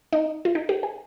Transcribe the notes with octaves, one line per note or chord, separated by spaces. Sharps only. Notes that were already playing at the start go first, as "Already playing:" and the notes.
D#4
F4
D#4
G4
G#4